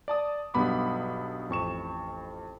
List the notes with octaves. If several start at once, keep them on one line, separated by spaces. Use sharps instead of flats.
D5 A5 D#6
B1 G2 B3 B5 D6
A1 F2 C#6 E7